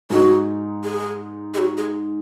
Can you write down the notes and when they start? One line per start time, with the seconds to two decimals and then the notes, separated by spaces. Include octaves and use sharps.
0.10 G#2 G#3 D#4 F#4
0.84 G#4
1.54 G#4
1.58 F#4
1.77 G#4